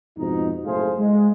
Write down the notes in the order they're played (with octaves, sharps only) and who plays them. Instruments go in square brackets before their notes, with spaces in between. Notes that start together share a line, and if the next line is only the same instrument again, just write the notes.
[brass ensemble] F2 G#2 B2 D#4
F#1 A2 A3 G#4 C5 F5
G#3